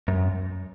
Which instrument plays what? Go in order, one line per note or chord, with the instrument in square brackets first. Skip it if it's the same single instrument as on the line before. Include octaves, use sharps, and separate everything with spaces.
[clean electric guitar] F#2